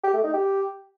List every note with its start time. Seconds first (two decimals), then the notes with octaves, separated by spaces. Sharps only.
0.04 G4
0.14 A3
0.24 D#4
0.34 G4